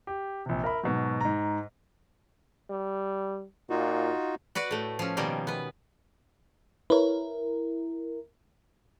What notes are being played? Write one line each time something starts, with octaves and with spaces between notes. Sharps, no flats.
G4
A#1 C3
A#4 E5 B5
G#2 B2 F#3
G#2 A#5
G3
A#2 D#4 F4 F#4
F#4 B4 D5 F#5
A2 A3
F3 C#4
B2 D#3 F3 G3 A#3
B3 B4
E4 A#4 B4 C#5